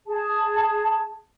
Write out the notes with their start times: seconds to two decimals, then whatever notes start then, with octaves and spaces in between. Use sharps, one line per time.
0.07 G#4 A5